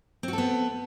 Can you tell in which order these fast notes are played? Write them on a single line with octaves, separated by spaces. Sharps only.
C4 F#4 A4 B3